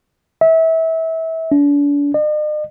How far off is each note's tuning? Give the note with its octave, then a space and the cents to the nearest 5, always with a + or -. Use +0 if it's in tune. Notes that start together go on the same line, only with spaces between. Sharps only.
E5 -25
D4 -40
D#5 -45